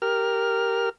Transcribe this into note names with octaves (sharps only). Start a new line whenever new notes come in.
G4 A#4 F6